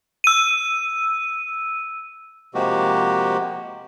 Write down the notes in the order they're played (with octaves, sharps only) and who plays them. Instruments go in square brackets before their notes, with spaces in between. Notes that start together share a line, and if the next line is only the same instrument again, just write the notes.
[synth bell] E6 D#7
[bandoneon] C3 F3 G#3 A#3 F#4 G4